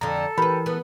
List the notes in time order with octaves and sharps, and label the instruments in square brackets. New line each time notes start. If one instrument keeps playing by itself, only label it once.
[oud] F2 D3 [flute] A4 [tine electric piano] A#5
[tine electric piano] E3 A#4 [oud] G4 B4 [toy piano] B5
[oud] B3